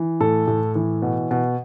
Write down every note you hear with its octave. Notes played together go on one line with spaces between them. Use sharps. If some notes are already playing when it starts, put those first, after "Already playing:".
Already playing: E3
A2 A4
A2
E3
B2
B2